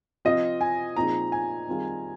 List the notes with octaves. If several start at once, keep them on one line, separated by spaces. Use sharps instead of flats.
C3 F3 C4 F4 D#5
G#5
A#2 F3 C4 D#4 G#4 A#5
G#5
D#3 G3 C4 F4 G#4